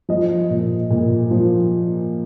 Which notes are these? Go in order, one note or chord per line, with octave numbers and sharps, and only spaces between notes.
F3 D#5
A#2
A#2
F3